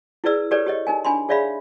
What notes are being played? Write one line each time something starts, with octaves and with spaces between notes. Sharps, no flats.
E4 G#4 B4 D5 E6
G4 A4 B4 C#5 D5
G4 C#5 D#5
D#4 A#4 G#5
D4 G#5 B5 C6
G#4 C#5 D5 E5 F5 B5